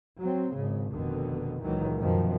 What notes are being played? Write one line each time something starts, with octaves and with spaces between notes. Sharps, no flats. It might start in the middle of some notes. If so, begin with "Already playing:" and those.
F#3 C4
G#1 C#3
F1 B2 D3 D#3
C#2 A#2 D#3 E3 F#3
F#2 B2 D#3 F3